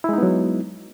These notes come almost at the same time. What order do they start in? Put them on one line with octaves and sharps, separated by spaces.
E4 G#3 D#4 B3 F#3